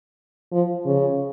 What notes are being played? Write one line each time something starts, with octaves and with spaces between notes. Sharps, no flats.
F3
C#3